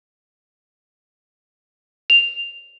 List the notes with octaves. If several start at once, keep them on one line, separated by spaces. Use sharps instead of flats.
F7